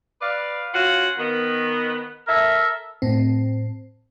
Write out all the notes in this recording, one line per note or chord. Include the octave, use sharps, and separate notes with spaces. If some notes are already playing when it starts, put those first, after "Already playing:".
B4 D5 F5
C#4 F4 F#4 F#5
D#3 B3
A4 A#4 E5
A2 C4